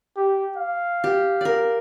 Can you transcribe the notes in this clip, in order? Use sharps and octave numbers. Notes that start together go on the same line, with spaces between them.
G4
F5
G4
A#4 D5